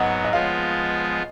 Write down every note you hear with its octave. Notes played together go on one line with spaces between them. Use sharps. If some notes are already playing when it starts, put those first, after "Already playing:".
Already playing: G#2 F#3 B3 D#5 F#5
D#5
F3 G#3 B3 F4 C#5 F5